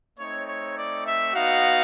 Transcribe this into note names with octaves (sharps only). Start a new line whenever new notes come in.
A3 C4 D#4 C#5
C#5
D5
E5
B3 D#4 F#4 F5